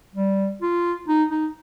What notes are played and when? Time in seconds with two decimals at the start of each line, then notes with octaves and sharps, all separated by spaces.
0.15 G3
0.62 F4
1.08 D#4
1.31 D#4